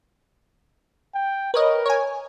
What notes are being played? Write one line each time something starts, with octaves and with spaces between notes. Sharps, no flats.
G5
A#4 B4 C#5 D#5
C#5 G#5